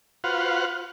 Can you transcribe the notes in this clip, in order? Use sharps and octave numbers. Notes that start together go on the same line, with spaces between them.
F4 F#4 B4 C5 F5 F#5